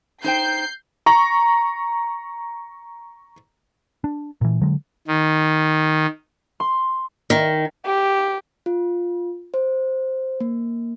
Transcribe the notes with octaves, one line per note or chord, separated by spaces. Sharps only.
D#4 C5 G5 G6 C7
A#5 C#6
D4
A#2 E3
D3 F#3 G#3
D#3
C6
D#3
G4
F4
C5
A#3